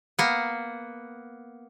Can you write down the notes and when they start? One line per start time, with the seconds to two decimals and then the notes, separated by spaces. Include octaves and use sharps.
0.19 A#3 B3